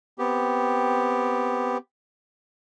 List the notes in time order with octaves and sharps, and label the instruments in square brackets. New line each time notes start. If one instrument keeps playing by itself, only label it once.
[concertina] B3 C4 G4